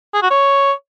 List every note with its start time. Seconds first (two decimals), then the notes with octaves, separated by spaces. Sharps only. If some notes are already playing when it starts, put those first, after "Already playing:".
0.14 G#4
0.22 F#4
0.30 C#5